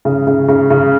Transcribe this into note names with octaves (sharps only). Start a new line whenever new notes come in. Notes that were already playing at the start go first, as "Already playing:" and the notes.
C#3
C#3
C#3
C#3